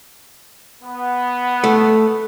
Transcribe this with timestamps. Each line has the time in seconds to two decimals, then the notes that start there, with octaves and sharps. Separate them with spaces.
0.83 B3
1.64 A3